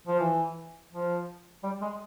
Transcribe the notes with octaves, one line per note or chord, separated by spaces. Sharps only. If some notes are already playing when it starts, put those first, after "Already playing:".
F3
E3
F3
G3
G#3